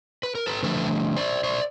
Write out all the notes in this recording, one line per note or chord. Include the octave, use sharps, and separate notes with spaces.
B4
A#4
A4 B4
D3 F3 A3 A4 B4
C5 D5
C5 D5